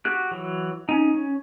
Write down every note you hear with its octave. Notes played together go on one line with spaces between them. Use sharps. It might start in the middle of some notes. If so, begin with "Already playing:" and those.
F#4 G4 F#6
E3 F#3
C#4 D#4
C#4